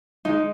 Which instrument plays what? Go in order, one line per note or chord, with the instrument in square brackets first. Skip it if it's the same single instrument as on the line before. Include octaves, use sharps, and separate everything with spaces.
[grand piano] G#3 [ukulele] D#4